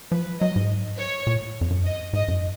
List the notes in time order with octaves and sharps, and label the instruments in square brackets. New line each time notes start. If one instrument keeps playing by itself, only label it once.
[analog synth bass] F3 [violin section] B4
[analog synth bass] F#3 [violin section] D#5
[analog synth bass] G#2
[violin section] C#5
[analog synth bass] A#2
F2
F#2
[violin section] D#5
[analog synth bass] G#2 [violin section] D#5
[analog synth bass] F#2